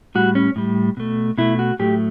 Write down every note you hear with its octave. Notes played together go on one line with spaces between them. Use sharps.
A2 G3 F#4
C#4
A2 G3
B2 A3
B2 A3 E4
F#4
A2 F#3 A3 G4